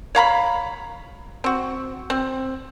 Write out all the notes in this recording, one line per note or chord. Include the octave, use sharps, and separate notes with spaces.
C#5 F5 A#5 B5
C4 F#4
C4